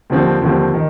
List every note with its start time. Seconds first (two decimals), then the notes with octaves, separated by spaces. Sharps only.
0.10 D#2 D3 F3 C4
0.42 D#2 D3 F3 C4
0.74 D#3